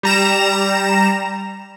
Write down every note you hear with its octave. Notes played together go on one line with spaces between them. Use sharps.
G3 A#5 E7